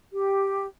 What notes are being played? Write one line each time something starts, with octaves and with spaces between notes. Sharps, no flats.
G4